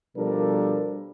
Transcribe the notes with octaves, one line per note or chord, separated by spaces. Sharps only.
B2 F3 G3 D4 A4 A#4